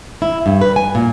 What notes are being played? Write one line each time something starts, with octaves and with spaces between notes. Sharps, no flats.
E4
G2
B4
G#5
A#2